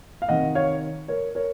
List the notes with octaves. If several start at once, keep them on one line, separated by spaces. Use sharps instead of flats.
F5
C3 D#3 D#5 F#5
C#5 F5
A#4 C#5
A#4 C#5